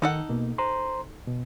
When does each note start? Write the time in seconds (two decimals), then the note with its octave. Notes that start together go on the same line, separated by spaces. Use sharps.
0.02 D#3 D#4 A4 F#5
0.29 B2 A#3
0.58 C5 A#5 C6
1.27 B2